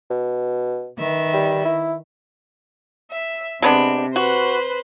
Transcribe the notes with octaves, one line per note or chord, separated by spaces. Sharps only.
B2
D#3 B4 E5
G3
E4
E5
C3 G#3 B3 D4
F#4 B4 C5